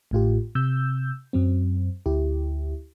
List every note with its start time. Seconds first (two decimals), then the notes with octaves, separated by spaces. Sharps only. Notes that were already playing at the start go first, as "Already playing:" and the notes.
0.11 A1 A2 F4 G4
0.55 C3 E6 G6
1.33 F#2 F#3 C4
2.06 D2 E4 G4